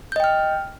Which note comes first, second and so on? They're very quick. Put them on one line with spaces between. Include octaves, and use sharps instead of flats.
G6 D#5 G5 F6